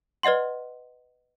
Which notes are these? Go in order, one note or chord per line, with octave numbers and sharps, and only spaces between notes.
B4 D5 D#5 F#5 C6